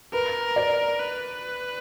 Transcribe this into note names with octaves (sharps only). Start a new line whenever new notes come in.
A#4 B4
D5
B4